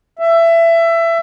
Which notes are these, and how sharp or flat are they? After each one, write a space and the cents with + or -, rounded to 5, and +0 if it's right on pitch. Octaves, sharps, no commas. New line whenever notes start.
E5 +20